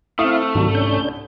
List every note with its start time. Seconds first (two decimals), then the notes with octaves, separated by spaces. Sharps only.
0.19 A3 C4 E4 F5 D#6
0.55 C2 G#2 D#3 F#3
0.75 C#4 D4 G6